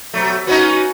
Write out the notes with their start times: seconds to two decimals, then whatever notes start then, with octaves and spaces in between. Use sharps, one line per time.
0.14 B2 F#3 A3
0.47 B3 C#4 D#4 F#4